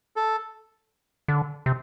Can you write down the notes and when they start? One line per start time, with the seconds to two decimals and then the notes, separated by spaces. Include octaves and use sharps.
0.16 A4
1.28 D3
1.66 C3